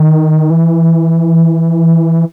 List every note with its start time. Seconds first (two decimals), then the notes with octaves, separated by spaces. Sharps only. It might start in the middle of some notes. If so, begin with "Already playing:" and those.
Already playing: D#3
0.50 E3